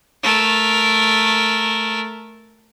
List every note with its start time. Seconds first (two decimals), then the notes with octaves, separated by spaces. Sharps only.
0.23 A3 A#4